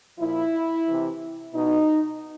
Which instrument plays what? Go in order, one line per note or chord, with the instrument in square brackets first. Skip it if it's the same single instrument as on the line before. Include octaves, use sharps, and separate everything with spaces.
[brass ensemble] A#2 F3 E4
C3 E3
B2 D#4